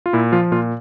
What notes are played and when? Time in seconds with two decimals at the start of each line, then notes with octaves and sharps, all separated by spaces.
0.06 F4
0.13 A#2 E4
0.32 F3 F4
0.52 A#2 F4